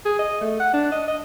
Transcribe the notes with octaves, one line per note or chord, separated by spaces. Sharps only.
G#4
D#5
A3
F#5
D4
D#5
D#5